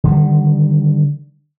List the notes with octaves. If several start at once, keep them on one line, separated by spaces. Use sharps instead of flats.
D3 D#3 G3